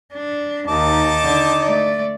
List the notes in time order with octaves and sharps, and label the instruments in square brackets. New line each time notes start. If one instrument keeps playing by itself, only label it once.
[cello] D4
[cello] D#2 [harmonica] D#4 A5 D6
[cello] D3
A3 D5